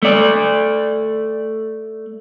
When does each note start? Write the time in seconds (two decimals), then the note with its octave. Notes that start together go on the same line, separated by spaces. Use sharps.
0.03 A3 D5